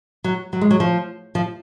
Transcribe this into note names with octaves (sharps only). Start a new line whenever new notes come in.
F#3
F#3
G#3
F#3
F3
F3